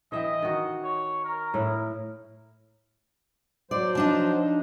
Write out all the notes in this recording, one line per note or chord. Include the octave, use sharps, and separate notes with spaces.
E3 D#5 E5 G5
D#3 F#4
C#5
A#4
A2 E4
F#3 C5 D5
F3 D4 D#4